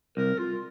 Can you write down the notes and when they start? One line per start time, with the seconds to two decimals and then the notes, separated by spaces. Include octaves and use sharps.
0.17 C2 A#4
0.38 F4